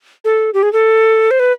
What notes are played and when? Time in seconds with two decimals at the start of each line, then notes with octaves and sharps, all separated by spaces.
0.25 A4
0.54 G4
0.63 G#4
0.73 A4
1.31 C5
1.40 B4